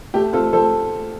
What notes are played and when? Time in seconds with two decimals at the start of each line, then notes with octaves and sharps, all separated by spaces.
0.14 A3 G4
0.33 C4 F4 A4
0.53 F3 A4 C5